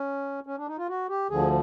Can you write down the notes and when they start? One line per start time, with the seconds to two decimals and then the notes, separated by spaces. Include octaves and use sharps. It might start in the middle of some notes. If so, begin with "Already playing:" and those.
Already playing: C#4
0.46 C#4
0.58 D4
0.67 D#4
0.78 F4
0.88 F#4
1.09 G4
1.30 D2 D3 F3 G#4